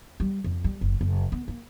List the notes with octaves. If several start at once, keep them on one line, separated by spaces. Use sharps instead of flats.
G3
F2
G3
F#1
F#1
B3
A#3